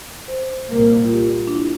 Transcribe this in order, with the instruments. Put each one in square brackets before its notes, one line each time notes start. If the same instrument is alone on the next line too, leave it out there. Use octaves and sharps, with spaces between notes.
[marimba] C5
[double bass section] C2 A#2 G3 A#3 [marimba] A#4
[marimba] F4
G4
D4
E4